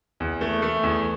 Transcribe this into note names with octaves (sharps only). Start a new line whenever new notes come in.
E2
A3
A3
E2